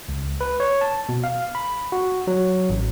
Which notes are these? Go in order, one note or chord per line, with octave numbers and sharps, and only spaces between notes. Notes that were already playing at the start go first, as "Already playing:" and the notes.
C#2
B4
C#5
A5
B2
F5
B5
F#4
F#3
A1